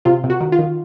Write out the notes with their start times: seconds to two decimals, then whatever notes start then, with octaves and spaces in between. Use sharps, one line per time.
0.05 C3 F4
0.24 C3
0.30 F#4
0.40 D#3
0.52 F4
0.59 D#3